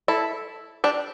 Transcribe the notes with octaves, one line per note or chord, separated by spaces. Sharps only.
E4 A4
D4 G4